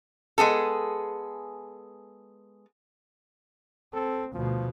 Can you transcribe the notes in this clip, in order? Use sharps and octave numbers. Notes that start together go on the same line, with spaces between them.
G#3 B3 G#4 A4
C4 A4
D2 B2 F3